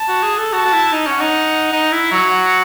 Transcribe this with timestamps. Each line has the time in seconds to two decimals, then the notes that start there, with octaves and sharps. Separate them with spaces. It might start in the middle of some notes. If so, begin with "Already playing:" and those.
Already playing: A5
0.08 F#4
0.23 G#4
0.38 A4
0.53 F#4 A5
0.65 F#4
0.73 E4
0.92 D#4
1.07 C#4
1.12 F#5
1.21 D#4
1.72 D#4
1.92 E4
2.12 F#3
2.31 F#5